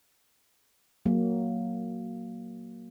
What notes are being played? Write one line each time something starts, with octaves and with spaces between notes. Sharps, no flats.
F#3 A#3